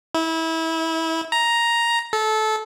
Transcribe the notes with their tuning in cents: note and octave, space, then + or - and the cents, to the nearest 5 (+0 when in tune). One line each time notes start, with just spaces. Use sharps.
E4 -25
A#5 +5
A4 -20